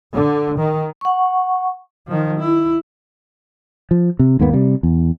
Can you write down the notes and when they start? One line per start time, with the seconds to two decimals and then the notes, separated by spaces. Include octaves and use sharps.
0.14 D3
0.59 D#3
1.01 F#5 C#6
2.07 D#3 F3
2.39 E4
3.91 F3
4.19 C3
4.40 D#2 G#2 A#3 B3
4.53 C3 G3
4.83 E2